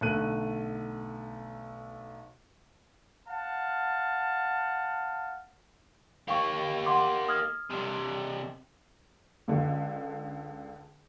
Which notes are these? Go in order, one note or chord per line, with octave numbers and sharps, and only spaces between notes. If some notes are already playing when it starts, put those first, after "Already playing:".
B1 D3 A3 F#6 D#7
F5 F#5 A5
A#3 G4 F5 G5 C#6
F#5 C6 D6
D#6 F6 G#6
C3 D4
C#2 D3